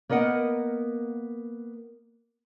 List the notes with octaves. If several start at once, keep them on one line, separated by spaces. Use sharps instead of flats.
A#3 B3 A#4 D#5 F#5